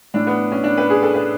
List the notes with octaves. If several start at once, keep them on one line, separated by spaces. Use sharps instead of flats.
A2 E3 D4
B3
C#4
D4
B4
G#4
A4
B4